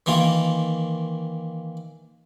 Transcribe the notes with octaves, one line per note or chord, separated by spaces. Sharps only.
D#3 E3 A#3 F4